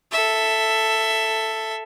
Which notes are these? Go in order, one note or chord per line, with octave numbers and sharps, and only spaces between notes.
A4 E5